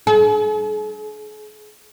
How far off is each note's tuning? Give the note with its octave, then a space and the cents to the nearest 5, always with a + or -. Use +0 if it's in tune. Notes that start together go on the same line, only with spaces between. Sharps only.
G#4 +40